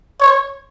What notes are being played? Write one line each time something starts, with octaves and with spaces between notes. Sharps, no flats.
C#5